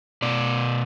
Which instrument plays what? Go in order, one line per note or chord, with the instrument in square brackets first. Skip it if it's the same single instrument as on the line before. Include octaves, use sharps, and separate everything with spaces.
[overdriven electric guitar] B2 D5